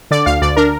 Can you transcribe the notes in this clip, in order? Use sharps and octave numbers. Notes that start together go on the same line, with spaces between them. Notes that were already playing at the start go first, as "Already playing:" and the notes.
D3 D5
D2 F5
D2 D5
D4 A#4